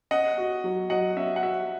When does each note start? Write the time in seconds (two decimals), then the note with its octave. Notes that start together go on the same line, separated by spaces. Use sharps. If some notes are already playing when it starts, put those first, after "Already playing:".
0.11 C#4 D#5 F#5
0.38 F#4
0.64 F#3
0.90 F#3 D#5 F#5
1.16 C#4 E5
1.36 F#5
1.42 F#4 E5